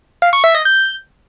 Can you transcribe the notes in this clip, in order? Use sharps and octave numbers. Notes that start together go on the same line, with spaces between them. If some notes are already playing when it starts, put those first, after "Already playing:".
F5
C#6
E5
D#5
G6